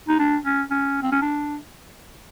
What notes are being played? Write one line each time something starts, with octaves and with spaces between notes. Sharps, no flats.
D#4
D4
C#4
C#4
C4
C#4
D4